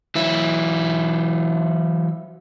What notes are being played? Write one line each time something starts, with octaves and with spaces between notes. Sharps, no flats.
E3 F#3 E4